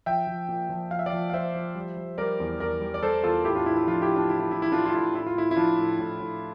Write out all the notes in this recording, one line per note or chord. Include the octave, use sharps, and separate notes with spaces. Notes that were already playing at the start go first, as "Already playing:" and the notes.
F3 E5 G5
F3
A#2
F3
F3 F5
E5
D5 F5
F3
F5
F3 C5 E5
F3
G3
G3
G3 A#4 D5
E2
E2 A#4 D5
G3
D5
G3 A4 C5
E2 F4 A4
A2 E4 G4
D4 F4
A2 E4
E4
F3 D4 F4
E4 G4
A2
D4 F4
A2 E4
E4
A2 E4
E4
A2 D4 F4
F4
A2 E4
A2 E4
F4
A2 E4
E4
F3 D4 F4
A2
A2
A2